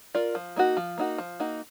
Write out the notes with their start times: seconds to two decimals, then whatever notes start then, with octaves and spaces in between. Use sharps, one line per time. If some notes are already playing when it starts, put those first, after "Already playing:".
0.14 F4 A#4 D5
0.35 F3
0.56 A#3 D#4 F#4
0.77 F3
0.98 A#3 D#4 F#4
1.18 F3
1.40 A#3 D#4 F#4